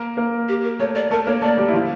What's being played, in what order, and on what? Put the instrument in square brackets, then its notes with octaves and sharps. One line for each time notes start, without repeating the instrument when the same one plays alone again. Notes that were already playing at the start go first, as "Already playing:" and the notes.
Already playing: [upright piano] A#3 A#4
A#3 A#4
[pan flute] G4
A#4
[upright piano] A3 A4 [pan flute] C#5
[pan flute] D5
[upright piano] A3 A4 [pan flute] A#4
[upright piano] A#3 A#4 [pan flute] C#5
[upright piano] A3 A4 [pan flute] D5
[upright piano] G3 G4
E4
F3 F4